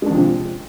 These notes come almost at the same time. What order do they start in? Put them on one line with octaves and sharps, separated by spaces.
G#3 D4 F3 C3